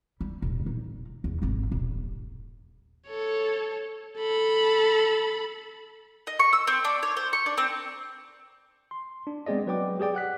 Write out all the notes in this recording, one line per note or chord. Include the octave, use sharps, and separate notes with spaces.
G3
D#1
A#2 D#4
E2
G#1 C4
D#1
A4 C#5
A4 B5
D#5
C#6
E6
C4
D4
C#5
C5
C#6
D4
C4
C6
D4
G#3 B3 C4 G#4 D5 D#5
F#3 B4 D5 G5 D6
G4 G#4 D5 G5 D6
F#5 F#6 B6